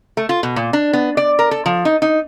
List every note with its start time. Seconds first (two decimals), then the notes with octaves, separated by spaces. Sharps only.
0.17 A3
0.29 F4
0.43 B2
0.56 A#2
0.73 D4
0.93 B3
1.17 D5
1.39 A#4
1.51 A4
1.66 F3
1.85 D#4
2.02 D#4